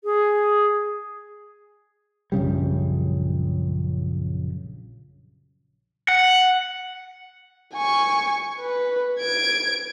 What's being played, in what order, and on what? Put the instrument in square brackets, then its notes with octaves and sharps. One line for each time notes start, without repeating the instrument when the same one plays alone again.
[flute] G#4
[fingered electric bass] A#1 F#2 C#3 G3
[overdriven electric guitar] F#5
[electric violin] G#5 C#6
B4
G#6 D7